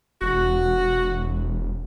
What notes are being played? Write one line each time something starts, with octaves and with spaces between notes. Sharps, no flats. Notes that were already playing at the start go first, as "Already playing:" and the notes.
E1 F#4